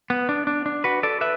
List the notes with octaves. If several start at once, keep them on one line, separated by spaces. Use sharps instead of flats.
B3
D4
D4
D4
F#4 B4
A4 D5
B4 E5